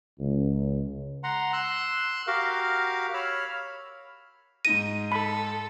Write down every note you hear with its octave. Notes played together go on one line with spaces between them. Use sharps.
C#2
F#5 A#5 C6
C6 E6 F#6
F#4 G4 A#4 F5
C#5 B5 E6 F6
G#2 D#4 A#6 D#7
A4 B5